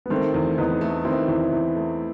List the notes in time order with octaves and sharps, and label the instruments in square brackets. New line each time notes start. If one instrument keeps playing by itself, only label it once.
[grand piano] B3
[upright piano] D#3 [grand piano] A3 C4
[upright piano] E2
[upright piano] E2 [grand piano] B3 D#4
[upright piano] A3
[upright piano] D#3 [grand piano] C4 E4
[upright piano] E2
E2
A3